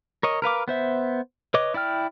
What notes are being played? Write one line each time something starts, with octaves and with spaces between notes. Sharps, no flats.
A#4 C#5 D#5
A#4 B4 F5 D6
B3 C5 E5
B4 C#5 D#5 D6
E4 D5 G5 F6